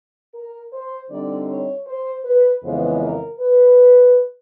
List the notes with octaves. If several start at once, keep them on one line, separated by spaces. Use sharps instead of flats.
A#4
C5
D3 G3 C4 D#4 D5
C#5
C5
B4
F2 C#3 E3 G#3 B3 C5
A#4
B4